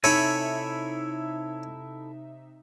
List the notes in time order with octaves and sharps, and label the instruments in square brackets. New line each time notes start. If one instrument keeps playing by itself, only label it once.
[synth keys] C3 D#4 E5 [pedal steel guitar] E4 A4 G#5 [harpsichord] C#5 B5